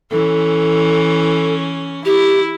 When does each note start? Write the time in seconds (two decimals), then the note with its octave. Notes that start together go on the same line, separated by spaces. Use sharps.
0.11 E3 C#4 A4
2.05 E4 G4